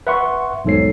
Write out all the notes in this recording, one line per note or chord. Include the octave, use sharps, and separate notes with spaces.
B4 E5 F#5 C6 C#6
B1 E2 G#2 A4 C#5 C7